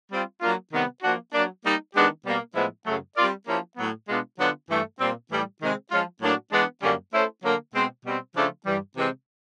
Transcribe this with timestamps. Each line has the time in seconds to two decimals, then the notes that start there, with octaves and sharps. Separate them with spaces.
0.11 G3 C4 F4
0.41 F#3 A#3 D4 F4
0.72 C3 D#3 G3 B3
1.03 F3 A#3 D4 F#4
1.33 F#3 A#3 D4
1.64 G3 A#3 D#4
1.94 D#3 G#3 B3 D4 G4
2.25 B2 G3 A#3
2.55 A2 F3 G#3 B3 E4
2.86 F#2 C#3 F#3 A3
3.16 G3 C4 F4 A#4 D5
3.47 F3 A#3 C#4 E4 G4
3.77 A2 F#3 B3
4.08 B2 G#3 B3 D4 F4
4.38 D3 F#3 B3 D4 F4
4.69 G2 E3 A3
4.99 A#2 G3 C4
5.30 A2 E3 G3
5.61 C3 D#3 G#3 C4
5.92 F3 G#3 C#4 F4
6.21 A2 F#3 A#3 D4 F#4
6.52 E3 G#3 B3 D4
6.83 F#2 D3 G3 A#3 C#4
7.13 A3 C#4 E4 A4 C5
7.44 D3 F#3 A#3
7.74 B2 G#3 C4
8.05 B2 G3 C4
8.35 C#3 F3 A3 D4 F4
8.66 G2 E3 G3
8.97 C3 E3 G#3 C4